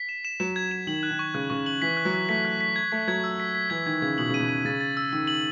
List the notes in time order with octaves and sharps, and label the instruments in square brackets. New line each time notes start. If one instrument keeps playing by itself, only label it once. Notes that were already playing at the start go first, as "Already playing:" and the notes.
Already playing: [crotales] B6
E7
E7
[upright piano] F#3 [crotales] E7
[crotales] G#6
E7
[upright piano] D#3 [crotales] F#7
[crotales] F#6
[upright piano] D#3
[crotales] C#6
[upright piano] C#3 [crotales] F#6
[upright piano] C#3 [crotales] C#6
[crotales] F#7
[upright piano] E3 [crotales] B6
[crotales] F#6
[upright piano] F#3
[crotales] B6
[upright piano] A3 [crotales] B6
[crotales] F#6
B6
G#6
[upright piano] A3 [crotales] B6
[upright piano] F#3 [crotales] G#6
[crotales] E6
B6
B6
[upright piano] E3 [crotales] G#6
[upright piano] D#3 [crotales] G#6
[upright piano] C#3 [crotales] G#6
[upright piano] B2 [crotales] F#7
[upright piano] C#3
[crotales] D#7
[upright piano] B2
[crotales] D#7
[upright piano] C#3 [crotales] A6
[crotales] A6
E6
[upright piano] D#3 [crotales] E6
[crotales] F#7